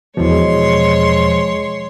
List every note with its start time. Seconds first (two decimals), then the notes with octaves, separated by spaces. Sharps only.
0.17 E2 B2 F3 G#3 C#5 C6